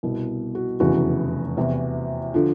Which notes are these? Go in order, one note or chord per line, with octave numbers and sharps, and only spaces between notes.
C2 B2
F#4
F1 E2 C#3 E3 F#4
E2 C3 E3
D3 F3